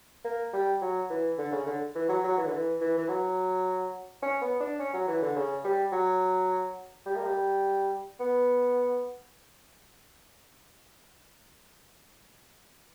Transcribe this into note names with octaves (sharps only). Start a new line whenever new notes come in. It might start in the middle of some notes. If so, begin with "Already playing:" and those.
A#3
G3
F#3
E3
D3
C#3
D3
E3
F#3
F#3
E3
D3
E3
E3
E3
F#3
C#4
B3
D4
C#4
F#3
E3
D3
C#3
G3
F#3
G3
A#3
G3
B3